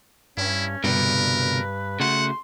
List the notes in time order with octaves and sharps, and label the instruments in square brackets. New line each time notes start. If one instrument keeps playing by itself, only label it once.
[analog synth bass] G2 [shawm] C#4 [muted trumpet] E4
[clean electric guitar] C2 B2 D3 [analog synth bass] G2 [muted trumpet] A#4 [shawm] B4
[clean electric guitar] C#3 A3 F#4 [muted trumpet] F#5 [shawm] C6